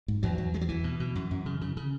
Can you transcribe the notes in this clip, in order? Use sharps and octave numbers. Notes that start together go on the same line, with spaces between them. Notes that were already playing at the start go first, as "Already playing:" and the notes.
G#2
E2 F#3
E2
E2 G#3
F#3
E2 E3
B2
B2
F#2
F#2
C#3
C#3
C#3